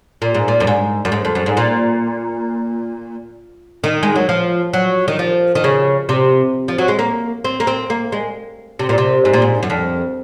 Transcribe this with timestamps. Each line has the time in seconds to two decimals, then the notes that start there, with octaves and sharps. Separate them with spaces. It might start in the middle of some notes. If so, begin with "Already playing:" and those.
0.22 A#2
0.34 G#2
0.48 A#2
0.60 F#2
0.67 G#2
1.05 F#2
1.12 G#2
1.25 F2
1.35 F#2
1.46 G#2
1.57 A#2
3.84 D#3
4.03 G#3
4.16 F#3
4.29 F3
4.73 F#3
5.08 D#3
5.19 F3
5.55 D#3
5.64 C#3
6.09 C3
6.68 F3
6.78 F#3
6.88 G#3
6.99 A#3
7.44 C4
7.60 A#3
7.67 C4
7.90 A#3
8.12 G#3
8.79 C3
8.89 A#2
8.98 C3
9.25 G#2
9.33 A#2
9.42 G#2
9.63 F#2
9.70 F2